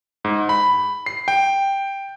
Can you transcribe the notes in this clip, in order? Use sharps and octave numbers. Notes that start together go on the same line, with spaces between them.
G#2
B5
C7
G5